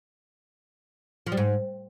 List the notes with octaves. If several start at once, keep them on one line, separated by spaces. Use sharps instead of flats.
F3
G3
G#2